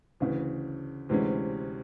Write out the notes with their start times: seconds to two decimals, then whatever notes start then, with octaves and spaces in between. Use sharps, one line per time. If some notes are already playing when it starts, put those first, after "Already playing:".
0.20 D2 C#3 E3
1.09 D2 C3 E3 G#3 C#4